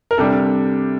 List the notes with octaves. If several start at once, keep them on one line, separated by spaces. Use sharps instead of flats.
A#4
C3 G3 D4 A4